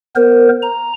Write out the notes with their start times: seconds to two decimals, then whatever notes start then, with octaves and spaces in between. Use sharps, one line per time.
0.16 B3 A#4 C5
0.62 A#5